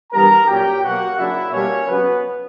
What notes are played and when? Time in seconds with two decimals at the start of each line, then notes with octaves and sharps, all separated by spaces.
0.12 G2 E3 G3 B3 A#4 A#5
0.47 A#2 F#3 C#4 G4 G5
0.83 B2 F#3 A#3 F#4 F#5
1.17 C#3 F#3 A#3 D4 E4 E5
1.52 B2 G3 A#3 C#4 D4 C#5
1.87 C#3 F#3 B3 C#4 B4